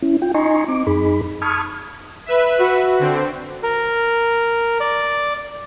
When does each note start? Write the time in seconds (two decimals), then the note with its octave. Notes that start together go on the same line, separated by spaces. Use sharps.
0.02 C#4 E4
0.22 F4 G5
0.34 D#4 D#5 G#5 A#5 C6 C#6
0.68 C4 D6
0.87 F#2 D#4 G#4 B5
1.42 A5 B5 C#6 D#6 F6 G#6
2.26 B4 E5
2.59 F#4
2.99 D3 C4
3.63 A#4
4.80 D5